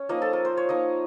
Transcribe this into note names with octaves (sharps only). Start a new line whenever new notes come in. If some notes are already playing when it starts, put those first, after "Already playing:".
Already playing: C#4 C#5
F3 A#3 D#4 D#5
A4
A#4
C5
C#5
F3 A#3 D#4 D#5